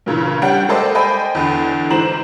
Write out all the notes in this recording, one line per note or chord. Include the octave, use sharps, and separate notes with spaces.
G2 A#2 C#3 E3
G3 C#4 D4 G4 F#5 G5
G#3 A#3 A4 C5 D5 D#5
C5 D#5 G5 G#5 B5
E2 D3
G#2 E3 C5 A#5 E7 F#7